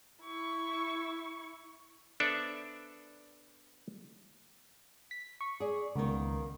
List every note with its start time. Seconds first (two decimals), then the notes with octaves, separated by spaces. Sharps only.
0.23 E4 C#6
2.20 B3 D4 A4 C5 D5 E5
5.11 B6
5.41 C#6
5.60 G#4 D5
5.96 C#2 D#3 A#3 B3